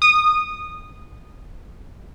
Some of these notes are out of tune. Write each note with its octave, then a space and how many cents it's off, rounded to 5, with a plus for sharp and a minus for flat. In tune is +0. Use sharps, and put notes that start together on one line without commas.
D#6 -15